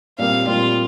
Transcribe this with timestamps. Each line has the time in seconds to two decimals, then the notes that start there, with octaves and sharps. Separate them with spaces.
0.18 A#2 G3 C4 G4 A#4 F5
0.47 A#2 G3 C4 F4 G4 A#4